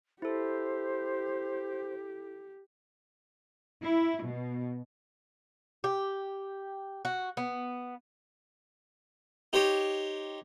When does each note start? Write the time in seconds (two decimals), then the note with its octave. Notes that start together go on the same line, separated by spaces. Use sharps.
0.22 E4 G4 A4 C5
3.81 E4
4.24 B2
5.84 G4
7.05 F#4
7.37 B3
9.53 D#4 G4 C5 C#5